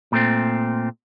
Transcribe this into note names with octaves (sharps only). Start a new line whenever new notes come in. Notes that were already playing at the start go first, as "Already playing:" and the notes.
A#2 A3 C4